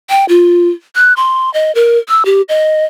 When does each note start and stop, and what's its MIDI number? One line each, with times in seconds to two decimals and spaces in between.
0.10 0.25 79
0.29 0.69 65
0.96 1.13 90
1.17 1.52 84
1.54 1.74 75
1.75 1.98 70
2.09 2.23 88
2.25 2.42 67
2.49 2.85 75